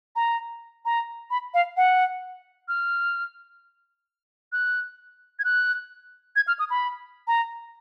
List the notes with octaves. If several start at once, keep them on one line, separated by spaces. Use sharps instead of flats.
A#5
A#5
B5
F5
F#5
F6
F#6
G#6
F#6
G#6
F6
D#6
B5
A#5